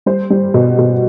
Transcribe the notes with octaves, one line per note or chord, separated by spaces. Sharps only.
G3 C5
G3
B2
B2